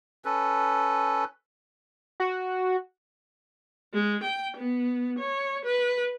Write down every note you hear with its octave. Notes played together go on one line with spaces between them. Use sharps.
C#4 A4 B4
F#4
G#3
G5
B3
C#5
B4